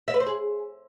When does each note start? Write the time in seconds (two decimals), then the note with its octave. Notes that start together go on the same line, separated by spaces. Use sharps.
0.08 E5
0.14 B4
0.20 C5
0.26 G#4